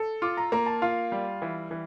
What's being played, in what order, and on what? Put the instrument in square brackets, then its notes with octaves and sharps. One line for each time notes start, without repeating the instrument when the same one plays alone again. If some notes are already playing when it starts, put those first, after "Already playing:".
Already playing: [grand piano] A4
[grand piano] F4 [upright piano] D6
[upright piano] A#5
[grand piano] A#3 [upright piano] A#5
[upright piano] A5
[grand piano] F4 [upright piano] F5
[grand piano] G3
E3
E3